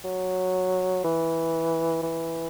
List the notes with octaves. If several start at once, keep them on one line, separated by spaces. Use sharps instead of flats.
F#3
E3
E3